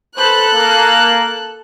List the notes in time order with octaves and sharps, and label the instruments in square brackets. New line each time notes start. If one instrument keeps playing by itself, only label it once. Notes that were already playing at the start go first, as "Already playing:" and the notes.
[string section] A4 F#6 [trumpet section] B4 C5 B5
[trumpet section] A#3